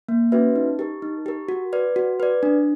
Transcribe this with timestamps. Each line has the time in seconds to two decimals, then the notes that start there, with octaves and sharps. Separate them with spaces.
0.08 A#3
0.32 C#4 F#4 B4 E5
0.56 D#4
0.79 G4 A#4
1.02 D#4
1.26 G4 A#4
1.49 F#4
1.73 B4 D5
1.96 F#4
2.20 B4 D5
2.43 D4